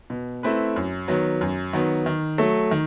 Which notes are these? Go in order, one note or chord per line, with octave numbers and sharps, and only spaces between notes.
B2
A3 C4 E4 B4
F#2
D#3 F#3 B3
F#2
D#3 F#3 B3
D#3
F#3 A3
D#3